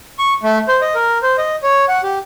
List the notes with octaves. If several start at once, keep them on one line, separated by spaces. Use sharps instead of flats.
C#6
A3
C5
D#5
A#4
C5
D#5
C#5
F#5
G4